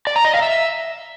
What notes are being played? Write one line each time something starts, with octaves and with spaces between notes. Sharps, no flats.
D5
A#5
D#5
F5
E5